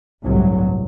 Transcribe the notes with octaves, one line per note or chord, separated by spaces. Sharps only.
G1 C2 A2 F#3